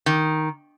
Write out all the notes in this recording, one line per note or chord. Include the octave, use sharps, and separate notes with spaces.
D#3